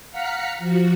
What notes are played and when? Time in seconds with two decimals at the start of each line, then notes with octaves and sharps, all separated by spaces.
0.10 F5 F#5 A#5 F6 B6 C#7
0.59 F3 F#4